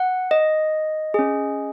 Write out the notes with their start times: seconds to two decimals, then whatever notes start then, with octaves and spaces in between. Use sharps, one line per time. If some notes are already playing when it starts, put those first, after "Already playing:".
Already playing: F#5
0.31 D#5
1.14 C#4 G#4